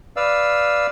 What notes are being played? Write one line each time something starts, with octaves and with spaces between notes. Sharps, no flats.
B4 D5 F5 E6